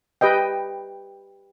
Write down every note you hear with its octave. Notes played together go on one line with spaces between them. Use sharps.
G4 B4 D#5 G5